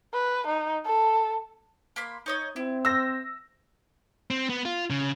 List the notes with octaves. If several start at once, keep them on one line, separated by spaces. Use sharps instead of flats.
B4
D#4
A4
A#3 B5 C6
D#4 C#5 D#5
C4 E4
C5 E6 A#6
C4
B3
F4
C#3